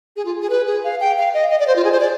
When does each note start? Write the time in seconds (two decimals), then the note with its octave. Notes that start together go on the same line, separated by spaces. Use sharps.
0.16 G#4
0.25 F4
0.42 G#4
0.50 B4
0.67 G#4
0.84 F5
1.00 G5
1.18 F5
1.34 D#5
1.50 D#5
1.60 D5
1.67 C5
1.76 F4
1.84 G#4
1.92 C5
2.00 D5